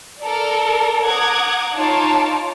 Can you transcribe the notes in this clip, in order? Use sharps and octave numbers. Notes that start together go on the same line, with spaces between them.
A4 A#4 D5
F#5 A#5 D6 D#6 F#6 G#6
D#4 F4 C#5 A5 D6